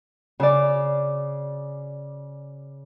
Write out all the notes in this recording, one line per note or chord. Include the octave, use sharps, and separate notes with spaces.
C#3 D5